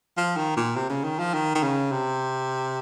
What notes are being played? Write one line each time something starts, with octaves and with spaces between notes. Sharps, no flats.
F3
D#3
A#2
C3
C#3
D#3
F3
D#3
D#3
C#3
C3